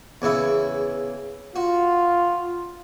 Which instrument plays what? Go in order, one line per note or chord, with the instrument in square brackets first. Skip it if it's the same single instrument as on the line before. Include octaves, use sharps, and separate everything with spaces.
[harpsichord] E2 C#3 E4
[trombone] F4 [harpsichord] F#4